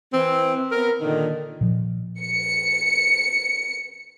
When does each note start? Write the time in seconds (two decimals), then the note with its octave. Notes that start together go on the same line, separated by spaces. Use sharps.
0.13 E3 C4
0.72 B3 A#4
1.02 A#2 D3 D#3
1.61 A#2 F3
2.21 C#7